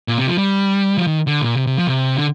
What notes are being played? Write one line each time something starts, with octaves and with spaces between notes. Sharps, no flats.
A#2
C3
F3
G3
F3
D#3
D3
A#2
C3
C3
F3
C3
D3